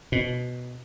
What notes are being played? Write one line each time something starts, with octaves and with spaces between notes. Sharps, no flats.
B2